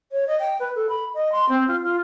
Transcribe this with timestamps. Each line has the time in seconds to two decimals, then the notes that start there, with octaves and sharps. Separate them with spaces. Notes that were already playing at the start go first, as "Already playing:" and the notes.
0.12 C#5
0.27 D#5
0.39 G5
0.59 B4
0.75 A4
0.89 B5
1.14 D#5
1.32 C6
1.49 C4
1.67 F4
1.83 F4